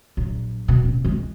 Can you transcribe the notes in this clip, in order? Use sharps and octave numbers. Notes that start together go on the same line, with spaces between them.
A#1 F#3
B2
C#2 A#2
E3 G#3